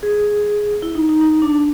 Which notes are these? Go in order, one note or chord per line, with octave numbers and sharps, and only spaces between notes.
G#4
E4
D#4
D#4
D#4
D4